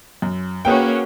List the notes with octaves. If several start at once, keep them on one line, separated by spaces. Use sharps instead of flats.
F#2
A#3 C#4 F#4 G#4 B4 G5